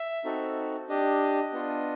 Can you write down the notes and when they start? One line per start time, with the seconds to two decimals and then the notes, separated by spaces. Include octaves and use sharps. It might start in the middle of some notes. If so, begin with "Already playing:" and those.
Already playing: E5
0.25 C4 D#4 F#4 A4
0.89 D4 G4 D#5
1.53 B3 D4 F4